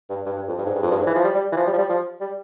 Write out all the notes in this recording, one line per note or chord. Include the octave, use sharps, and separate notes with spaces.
G2
G2
G2
F2
G2
G#2
G2
F2
G2
G#2
E3
F3
G3
G3
E3
F3
G3
F3
G3
F3
G3